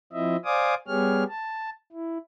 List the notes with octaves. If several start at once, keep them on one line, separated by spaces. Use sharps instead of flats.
F3 C4 E4 D#5 E5
C5 D5 F5 G#5 D6 D#6
G3 B3 G4 G#4 C#5 F6
A5
E4